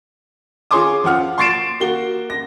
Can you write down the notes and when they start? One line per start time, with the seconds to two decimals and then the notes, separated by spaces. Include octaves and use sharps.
0.71 F4 G#4 C#5 C6 D6 D#6
1.04 F3 F4 F#5 F6
1.38 C6 C#6 A6 C7 D7 E7
1.80 A#3 F#4 G7
2.30 A#6